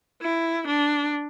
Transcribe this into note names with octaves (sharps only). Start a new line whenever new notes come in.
E4
D4